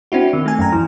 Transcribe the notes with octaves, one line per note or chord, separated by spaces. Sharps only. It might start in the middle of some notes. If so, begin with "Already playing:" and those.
C4 D4 E4 F#4
D#3
A3 G#5
F#2 A#5
E3